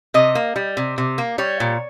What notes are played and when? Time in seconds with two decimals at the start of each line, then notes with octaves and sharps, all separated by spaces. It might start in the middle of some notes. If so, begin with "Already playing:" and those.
0.14 C3 D#5
0.35 A#3
0.56 G3
0.77 C3
0.98 C3
1.18 A#3
1.38 G3 C#5
1.60 A#2